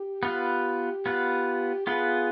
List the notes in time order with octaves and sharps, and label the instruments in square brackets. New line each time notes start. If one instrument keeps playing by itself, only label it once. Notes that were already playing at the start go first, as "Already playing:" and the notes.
Already playing: [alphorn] G4
[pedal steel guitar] B3 F4 B4
B3 F4 B4
[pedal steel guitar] B3 F4 B4 [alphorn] G#4